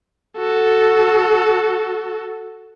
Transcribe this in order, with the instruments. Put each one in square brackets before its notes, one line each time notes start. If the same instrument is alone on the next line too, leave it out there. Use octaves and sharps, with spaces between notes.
[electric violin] F#4 A4